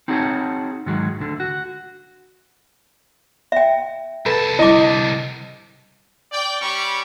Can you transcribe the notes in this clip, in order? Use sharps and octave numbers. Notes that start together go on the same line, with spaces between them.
C4 D#4 F#4 G#4 C#5 A5
G#2 D#3 F#3 G#3
D2 D3
F#4
E5 G5
C2 A4 B4 A5
D3 G3 E4 D#5 D6
D5 G5
G3 C#4 G4 B5 C#6